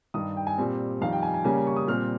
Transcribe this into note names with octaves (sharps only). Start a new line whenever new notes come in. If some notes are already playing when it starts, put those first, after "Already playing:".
G2 D#3 G3 D#6
G5
G#5
A#2 G3 C4
F2 D#3 G3 F5
G5
G#5
G#5
C#3 G3 A#3 C#4 G#5
C#6
D#6
A#2 G3 C4 F6